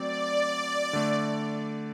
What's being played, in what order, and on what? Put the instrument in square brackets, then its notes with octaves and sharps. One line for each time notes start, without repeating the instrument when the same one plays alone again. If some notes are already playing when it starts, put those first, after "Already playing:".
Already playing: [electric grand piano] F#3 A3 C4 [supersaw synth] D5
[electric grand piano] D3 A3